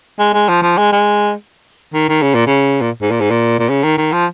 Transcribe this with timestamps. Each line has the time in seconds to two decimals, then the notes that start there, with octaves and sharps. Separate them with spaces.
0.19 G#3
0.34 G#3
0.49 F3
0.62 F3
0.78 G#3
0.93 G#3
1.94 D#3
2.09 D#3
2.22 C#3
2.35 A#2
2.47 C#3
2.81 A#2
3.02 G#2
3.11 A#2
3.21 G#2
3.30 A#2
3.59 A#2
3.69 C#3
3.84 D#3
3.98 D#3
4.12 F3